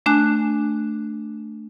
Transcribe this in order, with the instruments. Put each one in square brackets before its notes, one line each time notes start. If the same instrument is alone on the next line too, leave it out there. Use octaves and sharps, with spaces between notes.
[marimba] A3 D4 G#5 F#6